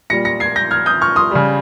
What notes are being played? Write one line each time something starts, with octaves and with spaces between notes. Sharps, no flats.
A#2 G3 A#6 C#7
A#6 C#7
G#6 C7
G6 A#6
F6 G#6
D#6 G6
C#6 F6
C6 D#6
C#3 G3